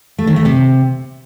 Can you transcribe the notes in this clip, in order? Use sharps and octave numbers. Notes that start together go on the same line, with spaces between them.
A3
D#3
A3
C3